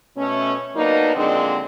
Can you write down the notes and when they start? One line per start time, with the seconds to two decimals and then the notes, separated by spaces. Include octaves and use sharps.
0.16 B2 A3 C#4
0.75 F#3 A#3 B3 D4 D#4
1.15 D#2 A#2 D3 G#3 C4 D4